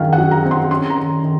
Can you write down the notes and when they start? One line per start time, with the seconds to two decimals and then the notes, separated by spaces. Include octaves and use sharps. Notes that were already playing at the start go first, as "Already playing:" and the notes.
Already playing: F#2 D#3 F5
0.13 F#5
0.18 F#3
0.31 A#5
0.45 C4
0.51 C6
0.71 C#4 C6
0.90 A#5
0.97 D#3
1.23 D#3